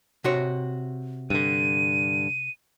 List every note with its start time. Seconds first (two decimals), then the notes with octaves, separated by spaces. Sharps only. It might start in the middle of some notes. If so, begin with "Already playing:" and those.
0.24 C3 F#4 C#5
1.30 G2 D3 D#7